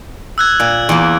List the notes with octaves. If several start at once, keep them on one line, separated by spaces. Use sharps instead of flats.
E6 F#6 G#6
A#2
E2 A#3